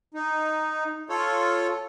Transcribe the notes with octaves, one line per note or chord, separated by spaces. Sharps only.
D#4
F4 A4 C#5